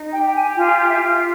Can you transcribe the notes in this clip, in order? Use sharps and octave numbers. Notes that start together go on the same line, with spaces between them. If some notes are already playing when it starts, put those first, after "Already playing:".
Already playing: D#4
G4 G5
G5
G#5
F4 G#5
E5
F4
F5